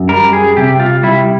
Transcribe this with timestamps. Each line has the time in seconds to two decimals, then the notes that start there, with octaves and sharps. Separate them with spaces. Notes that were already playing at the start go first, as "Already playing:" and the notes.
Already playing: F#2
0.09 G3 A#4
0.33 G#4
0.57 C3 G4
0.80 F4
1.03 G3 E4